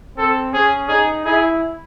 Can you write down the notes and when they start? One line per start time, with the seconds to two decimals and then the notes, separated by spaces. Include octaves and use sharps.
0.17 C4 A4
0.53 C#4 G#4
0.89 D#4 G#4
1.25 E4 G#4